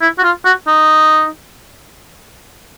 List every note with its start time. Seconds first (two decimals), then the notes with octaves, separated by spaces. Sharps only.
0.01 E4
0.19 F#4
0.24 F4
0.45 F#4
0.67 D#4